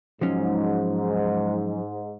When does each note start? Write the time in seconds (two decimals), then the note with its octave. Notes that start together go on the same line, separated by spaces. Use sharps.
0.21 G#2 F3 F#3 C#4